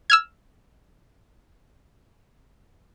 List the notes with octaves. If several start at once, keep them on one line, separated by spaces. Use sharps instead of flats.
E6 F6 G#6